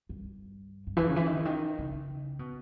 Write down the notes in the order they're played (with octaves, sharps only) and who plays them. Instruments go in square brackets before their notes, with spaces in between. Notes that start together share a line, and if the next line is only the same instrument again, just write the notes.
[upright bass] G2
G2
E3
C#3
E3
D#3
C#3
D#3
C#3
B2